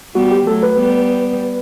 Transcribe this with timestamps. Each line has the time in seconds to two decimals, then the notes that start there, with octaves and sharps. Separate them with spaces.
0.15 G3 B3 F#4
0.31 G4
0.46 F#3 A3 A4
0.63 B4
0.78 G3 B3